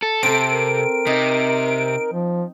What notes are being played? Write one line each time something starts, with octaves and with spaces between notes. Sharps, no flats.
A4
C3 C4 A4 D7
A#4
C3 D#4
F3